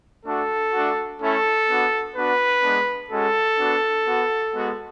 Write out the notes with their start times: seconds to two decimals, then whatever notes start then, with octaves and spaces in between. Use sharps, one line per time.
0.25 A3 D4 F#4 A4
0.72 A3 D4 F#4
1.20 A3 C#4 E4 A4
1.68 B3 D4 F#4
2.16 B3 D4 F#4 B4
2.62 G#3 B3 D4
3.10 G#3 C#4 F#4 A4
3.58 B3 D4 F#4
4.06 B3 F#4
4.53 G#3 B3 F#4